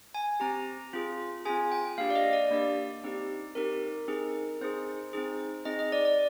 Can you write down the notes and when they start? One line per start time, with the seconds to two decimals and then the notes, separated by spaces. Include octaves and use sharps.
0.14 G#5
0.40 C4 G4 A#5
0.93 C4 F4 G#4
1.45 C4 F4 G#4 G#5
1.72 G5
1.98 A#3 D4 G4 F5
2.10 D5
2.15 D#5
2.33 D5
2.51 A#3 D4 G4
3.04 C4 D#4 G4
3.55 C4 D#4 G4 A#4
4.08 C4 D#4 G#4
4.61 C4 D#4 G#4 C5
5.13 C4 D#4 G#4
5.65 C4 D#4 G#4 D#5
5.79 D#5
5.92 D5
6.05 D5